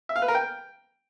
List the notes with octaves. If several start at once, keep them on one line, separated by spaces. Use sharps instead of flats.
E5
F5
B4
A#4
G5